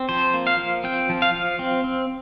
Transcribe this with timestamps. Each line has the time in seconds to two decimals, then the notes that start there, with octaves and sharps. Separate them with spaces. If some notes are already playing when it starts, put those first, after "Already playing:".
Already playing: C4
0.09 F3 C5
0.34 A#3
0.47 F5
0.59 F3
0.84 C4 G5
1.09 F3
1.22 F5
1.34 F3
1.59 C4
1.84 C4